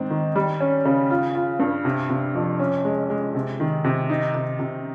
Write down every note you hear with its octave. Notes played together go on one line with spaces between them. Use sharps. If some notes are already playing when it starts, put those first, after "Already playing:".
Already playing: G#2 D#3 C4
D#3
G3
C#4
C#3
F4
F4
G2
C3
C3
F2
C#4
G#3
G#3
C3
D#3
C3
D#4
C3
C3